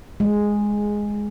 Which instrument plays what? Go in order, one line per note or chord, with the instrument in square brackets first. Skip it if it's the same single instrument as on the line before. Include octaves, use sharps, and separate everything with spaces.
[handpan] G#3